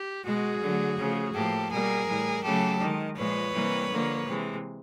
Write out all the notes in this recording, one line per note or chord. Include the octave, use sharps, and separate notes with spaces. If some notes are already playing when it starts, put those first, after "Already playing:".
Already playing: G4
B2 G#3 F#4 G#4
D3 F#3 A3
C#3 F3 A3
A2 F3 A#3 G4 A4
B2 G3 A#3 G#4 A#4
A2 E3 G3
C#3 F#3 A3 G4 A4
D#3 G#3
A#2 F3 G#3 B4 C#5
C3 E3 G3 A#3
D3 F3 A#3
C3 E3 G#3